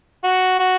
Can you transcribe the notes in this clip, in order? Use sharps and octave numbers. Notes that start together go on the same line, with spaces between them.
F#4
F#4